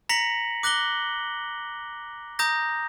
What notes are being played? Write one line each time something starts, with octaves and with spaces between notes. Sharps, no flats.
A#5 A#6 B6 C#7 F#7
D6 F#6 A#6 F#7 G7
A#5 D#6 G6 A#6